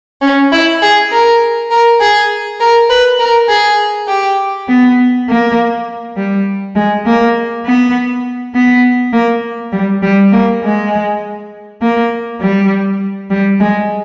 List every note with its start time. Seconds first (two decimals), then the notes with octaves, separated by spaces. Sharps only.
0.21 C#4
0.51 E4
0.81 G#4
1.11 A#4
1.70 A#4
2.00 G#4
2.60 A#4
2.89 B4
3.19 A#4
3.49 G#4
4.08 G4
4.68 B3
5.27 A#3
6.16 G3
6.75 G#3
7.05 A#3
7.64 B3
8.54 B3
9.12 A#3
9.72 G3
10.01 G3
10.32 A#3
10.62 G#3
11.81 A#3
12.40 G3
13.30 G3
13.59 G#3